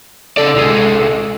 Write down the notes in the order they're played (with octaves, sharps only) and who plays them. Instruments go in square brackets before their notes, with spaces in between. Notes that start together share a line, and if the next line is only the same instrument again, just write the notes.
[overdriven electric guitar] C#3 D5 [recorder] A4
[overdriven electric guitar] C2 G#3